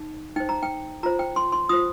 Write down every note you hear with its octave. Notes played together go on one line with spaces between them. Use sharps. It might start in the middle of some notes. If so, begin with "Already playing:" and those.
Already playing: D#4
D#4 C5 G5
A#5
G5
F4 C5 A#5
G5
C6
C6
F4 C5 D#6